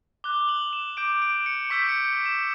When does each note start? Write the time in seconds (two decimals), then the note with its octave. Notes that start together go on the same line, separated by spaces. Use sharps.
0.24 D6 F#6 G7
0.49 F#7
0.73 E7
0.97 D6 G6 D7
1.22 D7
1.46 C#7
1.70 C#6 E6 G6 B6
1.89 C#7
2.26 E7